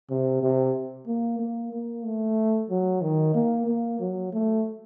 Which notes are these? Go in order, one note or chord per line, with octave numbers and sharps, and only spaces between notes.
C3
C3
A#3
A#3
A#3
A3
F#3
D#3
A#3
A#3
F#3
A3